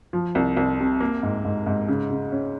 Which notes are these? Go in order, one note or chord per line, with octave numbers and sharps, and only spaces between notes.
F3
C2
C2
C3
A#3
G#2
G#2
G#2
C#3
C#3
C#4